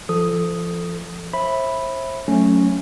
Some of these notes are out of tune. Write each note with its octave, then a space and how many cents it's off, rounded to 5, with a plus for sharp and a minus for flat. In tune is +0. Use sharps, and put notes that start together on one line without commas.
F3 -25 A4 +0 D#6 +0
C5 +40 E5 -5 B5 +0
F#3 +0 A3 +0 C#4 +0